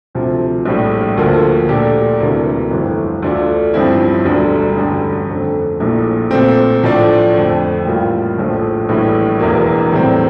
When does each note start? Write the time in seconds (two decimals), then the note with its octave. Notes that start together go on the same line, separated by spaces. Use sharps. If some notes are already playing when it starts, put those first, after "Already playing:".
0.15 D2 C3 F3
0.65 A#1 A2 G3
1.17 D2 D3 F3 A#3
1.68 A#2 A3 D4 G4
2.20 E1 D2 C3 E3 A#3
2.71 G1 F2 E3 A3
3.22 D2 D3 A3 D4 F4
3.74 A1 G2 F3 C4 E4
4.25 E1 D2 D3 G3
4.77 A1 G2 D3
5.29 F2 D3 A3
5.80 A#1 A#2 A3 E4
6.31 A#2 A3 C4
6.83 A2 F3 A3 D4
7.34 F2 D3 A3
7.85 A1 A2 G3 A#3 F4
8.38 A#1 A2 F3
8.89 A#1 A2 E3 G3
9.39 E1 E2 E3 A#3
9.92 A2 E3 G3 C4